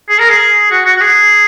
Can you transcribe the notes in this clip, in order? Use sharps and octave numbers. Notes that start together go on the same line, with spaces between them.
G#4
A#4
G#4
F#4
F#4
F#4
G#4